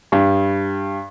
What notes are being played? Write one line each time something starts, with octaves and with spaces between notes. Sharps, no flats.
G2